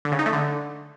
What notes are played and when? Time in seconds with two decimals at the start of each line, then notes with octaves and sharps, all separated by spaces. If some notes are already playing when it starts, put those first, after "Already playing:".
0.05 D3
0.12 C#3
0.19 D#4
0.26 A3
0.33 D3